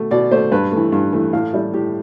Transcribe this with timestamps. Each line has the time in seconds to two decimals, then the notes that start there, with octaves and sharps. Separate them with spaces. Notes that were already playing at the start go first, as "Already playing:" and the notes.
Already playing: B2 A3
0.11 B2 D5
0.31 A3 C5
0.52 G2 B4
0.72 E3 A3
0.92 G2
1.13 E3 A3
1.33 A2 F5
1.53 G3 E5
1.74 A2 G4